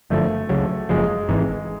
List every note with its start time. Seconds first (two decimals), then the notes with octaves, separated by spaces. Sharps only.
0.10 G1 F#2 D3 F3 A3
0.49 C#2 C#3 F#3
0.89 F#1 F#2 C#3 F3 G#3
1.29 G#1 G#2 E3